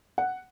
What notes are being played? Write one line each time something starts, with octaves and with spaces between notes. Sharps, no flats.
F#5